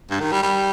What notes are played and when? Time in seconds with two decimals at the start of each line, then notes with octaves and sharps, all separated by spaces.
0.10 G2
0.20 D#3
0.32 G3
0.43 G3